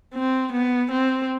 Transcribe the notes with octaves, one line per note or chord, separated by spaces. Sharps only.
C4
B3
C4